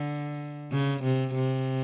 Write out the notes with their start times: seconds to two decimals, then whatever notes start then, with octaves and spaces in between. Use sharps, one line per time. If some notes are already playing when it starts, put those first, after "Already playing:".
Already playing: D3
0.72 C#3
1.03 C3
1.35 C3